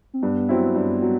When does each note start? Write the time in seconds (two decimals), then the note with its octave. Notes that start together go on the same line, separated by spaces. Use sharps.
0.14 C4
0.22 G2 B3
0.49 F#3 C4 E4
0.76 G2
1.02 F#3